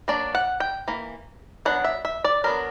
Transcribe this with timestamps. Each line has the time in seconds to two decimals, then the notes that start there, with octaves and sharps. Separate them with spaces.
0.08 F#3 A#3 D4 D5
0.35 F#5
0.60 G5
0.88 E3 A#3
1.65 F#3 B3 D4 F#5
1.84 E5
2.05 E5
2.24 D5
2.44 F#3 B3 D4 A#4